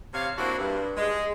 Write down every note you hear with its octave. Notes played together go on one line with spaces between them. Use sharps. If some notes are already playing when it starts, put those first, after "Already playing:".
C3 C#5 F5
A#3 C4 D4 E4 F#4
G2
G#3